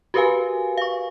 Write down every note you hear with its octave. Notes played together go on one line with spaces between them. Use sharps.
F#4 G4 A#4 B4 F5 G#5
F5 C#6